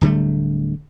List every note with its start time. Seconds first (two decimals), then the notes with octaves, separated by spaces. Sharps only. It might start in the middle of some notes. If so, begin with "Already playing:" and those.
0.01 D1 D3 G3 A3